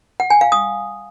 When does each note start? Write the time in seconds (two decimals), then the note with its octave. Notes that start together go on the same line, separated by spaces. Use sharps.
0.20 F#5
0.30 G#5
0.41 F5
0.52 D#6